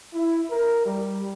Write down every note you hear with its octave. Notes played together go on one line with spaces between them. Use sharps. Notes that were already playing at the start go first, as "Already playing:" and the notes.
E4
A#4
G3